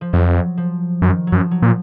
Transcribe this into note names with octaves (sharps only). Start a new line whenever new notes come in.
F3
F2 F#3
F3
F#2 D#3
F#3
F#2 F3
F#3
A#2 F3